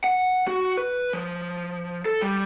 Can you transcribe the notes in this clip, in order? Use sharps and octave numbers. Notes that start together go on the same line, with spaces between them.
F#5
F#4
B4
F3
A4
G3